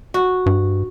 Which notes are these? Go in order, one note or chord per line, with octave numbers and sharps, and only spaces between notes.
F#4
G2